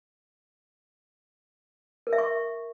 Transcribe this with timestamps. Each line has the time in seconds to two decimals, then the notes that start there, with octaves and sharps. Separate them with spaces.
2.07 A#4
2.13 E5
2.18 C#6